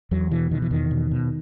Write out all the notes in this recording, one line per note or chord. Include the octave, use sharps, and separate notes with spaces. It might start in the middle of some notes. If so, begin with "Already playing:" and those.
E2 F#3
B2 E3
B2 D#3
E3
E2 D#3
B2
B2